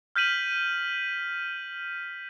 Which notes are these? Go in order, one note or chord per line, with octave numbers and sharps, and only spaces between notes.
F6 G6 B6 D#7 F#7